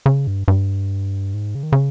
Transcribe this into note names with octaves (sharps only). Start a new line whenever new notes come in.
C#3
G2
G2
G#2
C#3
D#3
C#3